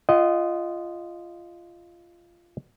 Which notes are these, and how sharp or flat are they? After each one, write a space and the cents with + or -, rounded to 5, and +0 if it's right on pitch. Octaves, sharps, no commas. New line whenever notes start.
F4 -15 D#5 -5 F#5 +40